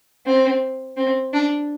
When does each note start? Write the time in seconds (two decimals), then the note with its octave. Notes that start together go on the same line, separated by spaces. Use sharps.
0.26 C4
0.97 C4
1.33 D4